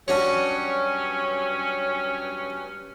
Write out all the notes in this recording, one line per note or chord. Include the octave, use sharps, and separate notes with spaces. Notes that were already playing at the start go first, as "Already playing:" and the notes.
G2 F#3 C#4 D4 F#4 C#5